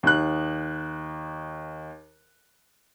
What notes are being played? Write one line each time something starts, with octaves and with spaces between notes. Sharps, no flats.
D#2 F#6